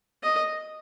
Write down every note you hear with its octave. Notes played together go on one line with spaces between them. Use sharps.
D#5